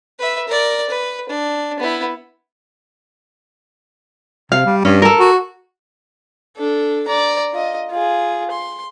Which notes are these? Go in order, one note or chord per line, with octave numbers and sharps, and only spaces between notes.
B4 E5
A#4 D5
B4
D4
B3 E4
C3 F5
G3
G2 C#4
A4 A#4
F#4
D4 A4
D5 A#5
F4 D#5
F4 G#4
C6